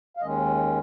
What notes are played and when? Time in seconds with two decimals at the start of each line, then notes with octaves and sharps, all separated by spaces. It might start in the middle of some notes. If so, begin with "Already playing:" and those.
0.17 F5
0.21 D#2 D#3 G#3 C#4 D#5